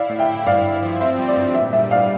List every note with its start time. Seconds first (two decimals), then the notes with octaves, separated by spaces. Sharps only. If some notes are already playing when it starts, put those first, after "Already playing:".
Already playing: E4 D5 F5
0.10 A2
0.19 E5 G5
0.29 E4
0.47 G2 D5 F5
0.64 G2
0.82 F3
1.01 C4 E5
1.19 G3
1.28 D5
1.37 G2
1.55 A#2 E5
1.73 G3 E5
1.91 A#2 D5 F5